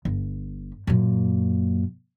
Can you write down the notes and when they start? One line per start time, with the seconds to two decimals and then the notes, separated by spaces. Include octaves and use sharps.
0.05 G1
0.87 F#2 A#2